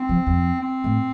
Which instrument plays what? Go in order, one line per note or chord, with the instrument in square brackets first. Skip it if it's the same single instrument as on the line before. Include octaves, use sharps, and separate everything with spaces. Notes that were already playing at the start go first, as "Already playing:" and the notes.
Already playing: [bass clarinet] C4
[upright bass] F3
F2
[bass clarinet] C4
[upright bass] A2